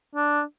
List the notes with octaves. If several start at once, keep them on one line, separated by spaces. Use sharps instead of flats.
D4